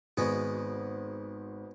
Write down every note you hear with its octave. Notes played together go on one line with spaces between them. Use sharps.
G#1 B2 G#3 B3